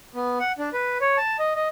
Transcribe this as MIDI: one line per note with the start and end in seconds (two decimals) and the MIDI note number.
0.15 0.39 59
0.40 0.52 78
0.58 0.69 62
0.73 0.98 71
1.01 1.17 73
1.18 1.37 81
1.39 1.54 75
1.55 1.68 75